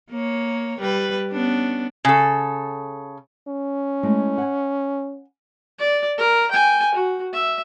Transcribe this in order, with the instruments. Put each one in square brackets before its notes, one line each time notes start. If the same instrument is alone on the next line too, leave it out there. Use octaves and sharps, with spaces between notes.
[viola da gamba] A#3 C#5
G3 B4
B3 C#4 D4
[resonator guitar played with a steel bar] C#3 A4
[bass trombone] C#4
[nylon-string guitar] G#3 A3 E4
F#5 G#5
[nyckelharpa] D5
A#4
G5 G#5
F#4
E5